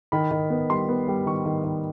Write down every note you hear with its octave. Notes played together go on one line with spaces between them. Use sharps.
D#3 B5
D#3
B3
G3 C6
B3
G3
D#3 C#6
D#3
D#3